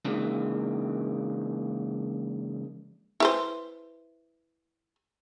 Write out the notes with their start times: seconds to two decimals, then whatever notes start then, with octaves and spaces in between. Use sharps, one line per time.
0.05 C#3 E3 G#3 A#3 D4 D#4
3.20 E4 B4 C5